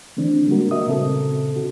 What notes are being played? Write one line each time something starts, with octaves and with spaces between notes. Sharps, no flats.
D3 E3 A3 C4 D4
G3 G#3 A#3 D4 F#4 A#4
F#4 A#4 D#5 E5 D#6
A#2 C#3 C4 A4
D3 F#4